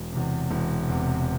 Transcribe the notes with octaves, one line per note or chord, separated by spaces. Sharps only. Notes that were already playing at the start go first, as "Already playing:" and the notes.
Already playing: E1
E2 C3
E1
E2 C3